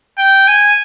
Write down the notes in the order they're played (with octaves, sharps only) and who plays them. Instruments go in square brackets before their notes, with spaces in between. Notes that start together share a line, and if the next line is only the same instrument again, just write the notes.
[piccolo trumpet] G5
G#5